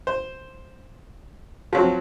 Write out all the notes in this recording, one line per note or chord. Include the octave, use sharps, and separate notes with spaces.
C5
F3 F#3 C4